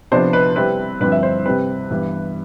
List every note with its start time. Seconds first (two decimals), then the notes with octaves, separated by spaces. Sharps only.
0.12 C3 F3 B3 D4 C5
0.33 B4
0.56 C3 G3 C4 E4 B4
1.00 G2 D3 F3 C4 B4
1.12 E5
1.23 C5
1.46 C3 G3 C4 B4
1.91 G2 E3 G3 B3